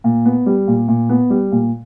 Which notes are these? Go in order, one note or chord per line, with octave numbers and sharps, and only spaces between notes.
A#2
B3
G3
A#2
A#2
B3
G3
A#2